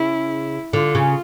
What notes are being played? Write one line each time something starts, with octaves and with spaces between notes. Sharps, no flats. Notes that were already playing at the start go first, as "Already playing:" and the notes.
Already playing: C#3 E4
D3 F4
C#3